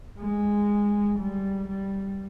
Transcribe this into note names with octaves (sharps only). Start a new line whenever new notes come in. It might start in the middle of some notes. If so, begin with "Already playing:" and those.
G#3
G3
G3